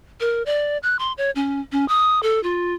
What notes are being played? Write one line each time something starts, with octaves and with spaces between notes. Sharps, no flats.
A#4
D5
F#6
C6
C#5
C#4
C#4
D#6
A4
F4